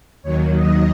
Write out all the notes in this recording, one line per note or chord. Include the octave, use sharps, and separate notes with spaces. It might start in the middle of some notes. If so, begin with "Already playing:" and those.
D#2 D#3 F#3 C#5
D#5